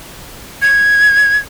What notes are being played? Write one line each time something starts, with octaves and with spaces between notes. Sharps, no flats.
G#6